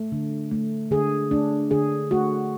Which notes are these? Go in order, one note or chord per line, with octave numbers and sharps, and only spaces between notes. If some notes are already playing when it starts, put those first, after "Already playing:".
Already playing: A3
D3
A3
D3 G#4
A3 D4
D3 G#4
A3 F#4